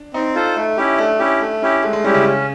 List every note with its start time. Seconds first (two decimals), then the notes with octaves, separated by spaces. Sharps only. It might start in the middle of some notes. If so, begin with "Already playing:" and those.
Already playing: D4
0.14 C4 D#4
0.35 F4 A4 C5
0.56 A3
0.77 C#4 E4 G4
0.98 A3 D4
1.19 C#4 E4 G4
1.41 A3
1.62 C#4 E4 G4
1.83 G#3 A3
1.93 G#3
2.04 G3 C#4 E4 G4
2.14 C#3
2.25 C#4